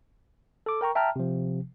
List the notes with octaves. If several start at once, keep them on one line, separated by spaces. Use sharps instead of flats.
A4 D6
A#4 G5 A#5 C#6
E5 G5 A5 A#5 F6
C3 F3